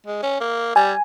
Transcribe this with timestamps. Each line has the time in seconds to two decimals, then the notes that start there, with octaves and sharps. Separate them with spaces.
0.07 G#3
0.23 C#4
0.40 A#3
0.76 G3 G#5